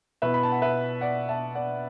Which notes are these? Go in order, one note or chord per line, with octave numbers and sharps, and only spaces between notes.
B2 B3 E4 B4 E5
B5
A5
F#5
B4 E5
D5 F#5
E5 A5
D5 F#5